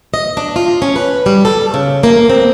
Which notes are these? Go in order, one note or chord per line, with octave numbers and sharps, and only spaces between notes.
D#5
D4
F4
C#4
B4
G3
A4
C#3
A#3
C4